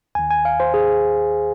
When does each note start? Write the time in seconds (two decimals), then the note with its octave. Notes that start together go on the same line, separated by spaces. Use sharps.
0.15 D#2 D#3 G#5
0.31 G#5
0.45 F5
0.60 C5
0.74 G#4